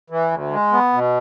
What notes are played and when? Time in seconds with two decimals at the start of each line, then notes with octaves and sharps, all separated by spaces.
0.10 E3
0.31 D2
0.52 G#3
0.72 B3
0.93 B2